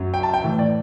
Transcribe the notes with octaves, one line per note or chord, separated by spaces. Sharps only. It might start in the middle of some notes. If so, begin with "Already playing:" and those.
Already playing: F#2 F#3
G5
A5
G5
A2 E3
D5